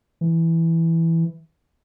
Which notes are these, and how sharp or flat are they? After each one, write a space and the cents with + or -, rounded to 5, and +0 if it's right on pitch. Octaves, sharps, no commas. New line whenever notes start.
E3 +0